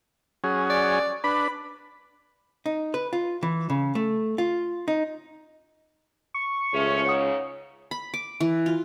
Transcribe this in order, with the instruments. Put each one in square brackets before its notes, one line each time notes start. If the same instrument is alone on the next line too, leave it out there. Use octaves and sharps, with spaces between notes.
[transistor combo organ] F#3 C#4 G#4
[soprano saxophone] D5
[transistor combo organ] D4 B4 [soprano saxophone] B5
[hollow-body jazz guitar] D#4
B4
F4
E3
C#3
A3
F4
D#4
[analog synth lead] C#6
[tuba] C#2 [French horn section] F3 A3 C#4 [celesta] G#4 E5 E7
[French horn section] G#2 C#3 [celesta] C#5 F#5 D#6
[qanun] B5
D6
E3
F4